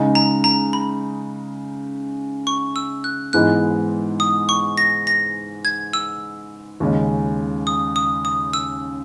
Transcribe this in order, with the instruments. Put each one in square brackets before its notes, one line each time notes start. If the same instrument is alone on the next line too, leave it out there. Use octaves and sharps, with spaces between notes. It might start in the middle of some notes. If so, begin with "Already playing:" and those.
Already playing: [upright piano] C#3 G#3 D#4
[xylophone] A#5
A#5
B5
C#6
E6
F#6
[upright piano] G#2 E3 G#3 B3 D#4 [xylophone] F#6
[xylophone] D#6
C#6
A#6
A#6
G#6
E6
[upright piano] D#2 C#3 G#3 C#4
[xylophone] D#6
D#6
D#6
E6